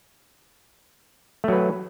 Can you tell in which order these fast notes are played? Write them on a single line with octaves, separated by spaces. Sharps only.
A3 F#3 B4